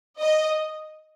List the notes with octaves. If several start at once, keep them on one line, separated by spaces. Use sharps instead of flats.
D#5